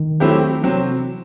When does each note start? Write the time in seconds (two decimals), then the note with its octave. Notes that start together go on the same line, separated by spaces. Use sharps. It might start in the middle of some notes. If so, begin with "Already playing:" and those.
Already playing: D#3
0.20 F#3 A3 C4 E4 G4
0.63 C3 E3 F#3 C4